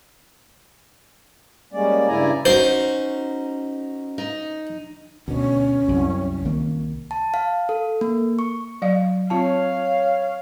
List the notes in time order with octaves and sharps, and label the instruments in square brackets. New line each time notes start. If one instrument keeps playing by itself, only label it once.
[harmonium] G3 G#3 A#3 C#4 D5
G2 C#3 E4 D5 G#5 A#5
[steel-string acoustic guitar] C#4 D#4 F#4 [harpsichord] C5
[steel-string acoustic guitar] D#4
[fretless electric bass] D2 B2 [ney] C#4
[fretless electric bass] C2 F#2
C2 D#3 A#3
[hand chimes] A5
F5
A4
A#3
C#6
[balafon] F#3 D5 F5
[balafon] C4 F4 A5 [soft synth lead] C#5 [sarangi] F5